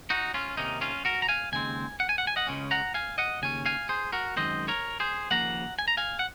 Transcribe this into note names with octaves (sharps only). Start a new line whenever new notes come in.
D#4 F#4
C#4 F4
C3 D#3 A#3 C#4 D#4
C#4 F4
F#4 A#4
A#5
F5 G#5
D#2 C#3 G#3 C4 G#5
F#5
G#5
F#5
G#5
D#5 F#5
C#2 C#3 G#3 C#4
F#5 A#5
F5 G#5
D#5 F#5
D#2 C#3 C#4 G#5
F5 G#5
G#4 C5
F#4 A#4
F#2 D#3 G#3 C4 C5 D#5
A#4 C#5
G#4 C5
D#2 C#3 F3 A#3 F#5 A#5
G#5
A#5
F5 G#5
F#5